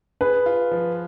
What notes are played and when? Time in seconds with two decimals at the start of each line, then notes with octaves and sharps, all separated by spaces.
0.21 G#4 B4
0.46 F4
0.71 F3